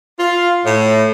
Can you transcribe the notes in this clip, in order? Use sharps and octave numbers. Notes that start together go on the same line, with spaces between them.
F4
A2